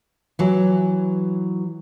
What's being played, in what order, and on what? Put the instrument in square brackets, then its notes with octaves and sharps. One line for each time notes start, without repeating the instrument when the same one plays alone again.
[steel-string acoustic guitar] E3 F#3